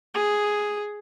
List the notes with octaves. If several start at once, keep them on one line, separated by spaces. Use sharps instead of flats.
G#4